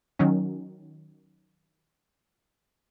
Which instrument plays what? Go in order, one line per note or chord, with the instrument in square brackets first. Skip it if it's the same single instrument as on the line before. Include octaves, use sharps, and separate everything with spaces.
[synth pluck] D#3 F#3 C#4